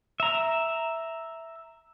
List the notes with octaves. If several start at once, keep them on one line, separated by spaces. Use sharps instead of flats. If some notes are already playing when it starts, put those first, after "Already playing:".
E5 A#5